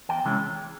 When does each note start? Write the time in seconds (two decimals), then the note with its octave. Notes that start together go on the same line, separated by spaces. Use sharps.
0.09 E2 G5
0.25 C3 E3 G#3 C#4